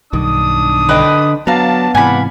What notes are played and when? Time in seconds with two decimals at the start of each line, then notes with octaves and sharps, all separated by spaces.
0.13 B1 G2 D#3 D4 D#6
0.89 D3 B4 D#5 G5
1.47 F#3 B3 D4 F5 A5 A#5
1.95 G#2 C3 E3 D5 F5 F#5 G#5 B5